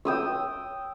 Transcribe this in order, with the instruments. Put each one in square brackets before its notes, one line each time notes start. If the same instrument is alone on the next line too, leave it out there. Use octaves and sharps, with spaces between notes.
[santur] G5 D#6 E6